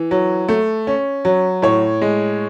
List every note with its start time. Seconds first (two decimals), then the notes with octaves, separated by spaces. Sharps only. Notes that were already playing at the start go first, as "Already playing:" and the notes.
Already playing: E3
0.11 F#3
0.49 A3
0.87 C#4
1.25 F#3
1.62 A2 C#5
2.02 G#3